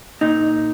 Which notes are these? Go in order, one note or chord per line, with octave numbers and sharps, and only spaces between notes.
A#2 D#4